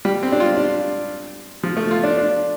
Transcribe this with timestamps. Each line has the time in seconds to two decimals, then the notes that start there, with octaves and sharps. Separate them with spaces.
0.05 G3
0.23 C4
0.32 D4
0.40 F4
0.57 D4
1.63 F3
1.77 A3
1.91 F4
2.04 D4
2.17 D4